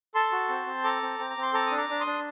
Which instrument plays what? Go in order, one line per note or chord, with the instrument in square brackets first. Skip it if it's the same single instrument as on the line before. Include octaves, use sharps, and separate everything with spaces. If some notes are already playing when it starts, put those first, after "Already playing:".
[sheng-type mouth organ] A4 A5 C6
F#4
C4
C4
A4 A#5 D6
C4
C4
A#5
C4
C6
A4 A#5 D6
D4 D#6
A#5 D6
D4
C6 D#6
D4